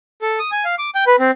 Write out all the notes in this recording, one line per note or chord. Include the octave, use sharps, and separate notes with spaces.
A4
D#6
G#5
F5
D6
G5
B4
C4